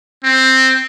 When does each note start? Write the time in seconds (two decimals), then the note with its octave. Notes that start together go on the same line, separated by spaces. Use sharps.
0.23 C4